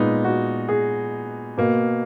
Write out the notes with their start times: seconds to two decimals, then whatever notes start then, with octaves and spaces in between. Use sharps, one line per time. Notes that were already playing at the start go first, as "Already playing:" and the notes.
Already playing: A#2 G#3 B3 D#4
0.25 F#4
0.69 G#4
1.58 B2 A#3